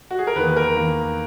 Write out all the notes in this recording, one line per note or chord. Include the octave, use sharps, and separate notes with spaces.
F#4
G#4
A#4
E2 D#3 A#3 B4
A#4
E2 D#3 A#3